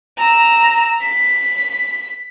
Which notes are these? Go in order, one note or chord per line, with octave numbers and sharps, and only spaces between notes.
A#5 E6
B6